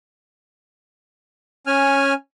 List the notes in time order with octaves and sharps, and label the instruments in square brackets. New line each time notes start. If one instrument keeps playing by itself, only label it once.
[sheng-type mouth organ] C#4 G#5 F6